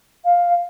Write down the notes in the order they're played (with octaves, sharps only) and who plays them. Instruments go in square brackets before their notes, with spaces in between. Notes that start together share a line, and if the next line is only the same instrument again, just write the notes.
[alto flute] F5